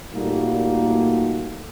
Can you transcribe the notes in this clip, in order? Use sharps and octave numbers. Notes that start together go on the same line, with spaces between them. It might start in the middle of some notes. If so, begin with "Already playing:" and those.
A#2 G3 A3 A#3 D#4 F#4